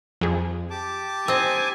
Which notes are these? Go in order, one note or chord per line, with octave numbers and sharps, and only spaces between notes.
F2 G#4
G4 A5 D6
C4 D#5 G#5